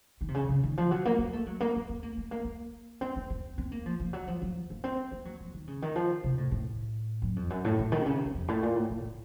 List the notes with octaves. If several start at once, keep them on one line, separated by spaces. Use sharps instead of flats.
D#3
C3
C#3
C#3
D#3
F3
F#3
A#3
A#3
A3
F#3
A#3
C4
C4
A#3
A3
A#3
A#3
C4
C4
C4
C4
A#3
F3
F3
F#3
F3
F3
A#3
C4
A#3
F#3
F3
D#3
C#3
D#3
F3
C3
A2
A2
F#2
F2
F#2
A2
A#2
D#3
C3
C#3
C3
F#2
F2
A2
A#2
A2
A2
A2